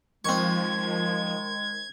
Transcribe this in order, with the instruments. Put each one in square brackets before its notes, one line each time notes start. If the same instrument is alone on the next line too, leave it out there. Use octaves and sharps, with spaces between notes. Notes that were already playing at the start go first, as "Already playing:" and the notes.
[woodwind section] D#3 G#3 [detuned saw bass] F3 [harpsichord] C4 C#6 [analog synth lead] G#6